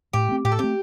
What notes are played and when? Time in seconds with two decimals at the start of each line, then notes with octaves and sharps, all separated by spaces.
0.13 A2 G4
0.29 A3 C4
0.44 A2 G4
0.52 A4
0.59 A3 C4 G4